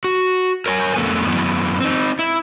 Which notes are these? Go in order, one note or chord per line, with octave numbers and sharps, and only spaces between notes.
F#4
A#4 C#5 G5 G#5
F2 A3 B3
F#2 E3 B3
C4 D#4
E4